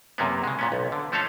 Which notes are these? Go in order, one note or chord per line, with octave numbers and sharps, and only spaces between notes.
F#2 C3 A#3 B3
C#3 G#3
A#2 B3 C#4
B1
D3
F3 A3 C#4 A4 F5